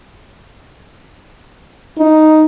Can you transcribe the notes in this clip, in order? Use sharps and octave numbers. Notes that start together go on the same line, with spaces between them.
D#4